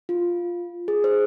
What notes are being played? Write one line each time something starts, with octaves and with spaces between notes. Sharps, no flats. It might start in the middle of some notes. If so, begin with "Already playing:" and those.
F4
G#4
C5